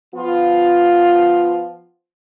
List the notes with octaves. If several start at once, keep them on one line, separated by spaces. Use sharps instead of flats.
F3 B3 F4